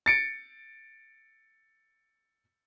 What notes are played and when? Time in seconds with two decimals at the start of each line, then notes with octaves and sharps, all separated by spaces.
0.06 A6 C#7 D7